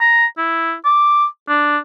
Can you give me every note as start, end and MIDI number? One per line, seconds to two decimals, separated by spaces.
0.01 0.26 82
0.38 0.74 64
0.85 1.26 86
1.49 1.78 62